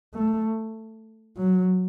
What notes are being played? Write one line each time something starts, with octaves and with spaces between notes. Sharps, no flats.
A3
F#3